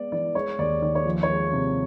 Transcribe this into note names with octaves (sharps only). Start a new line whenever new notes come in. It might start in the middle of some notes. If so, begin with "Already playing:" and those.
Already playing: G#3 B3 D5
E3 D5
G#3 C#5
D#2 D5
D#3 D5
C#5
F3
C#5
G#3
C3